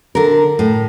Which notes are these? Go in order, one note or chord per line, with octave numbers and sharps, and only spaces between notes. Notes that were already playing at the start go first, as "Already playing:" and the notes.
D3 A#4
A2